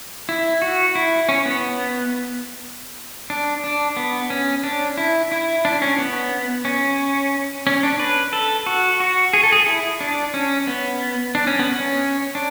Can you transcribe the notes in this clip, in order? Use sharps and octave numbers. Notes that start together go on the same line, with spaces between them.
E4
F#4
E4
C#4
B3
D4
D4
B3
C#4
D4
E4
E4
D4
C#4
B3
C#4
C#4
D4
B4
A4
F#4
F#4
G#4
A4
G#4
E4
D4
C#4
B3
D4
C#4
B3
C#4
D4